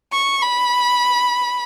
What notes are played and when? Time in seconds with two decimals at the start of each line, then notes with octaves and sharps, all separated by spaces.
0.12 C#6
0.41 B5